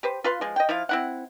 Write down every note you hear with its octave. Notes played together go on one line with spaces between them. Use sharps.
G4 B4 C5
F4 B4 F5 C6
F3 G#3
D#5 G5
F3 E4 F4 F5
C4 E4 F#5